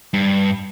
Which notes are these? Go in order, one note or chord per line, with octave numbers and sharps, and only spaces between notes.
G2